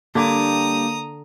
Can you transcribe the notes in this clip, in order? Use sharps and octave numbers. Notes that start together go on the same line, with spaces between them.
D3 G3 A#3 D4 G4 A#5 D6 D#6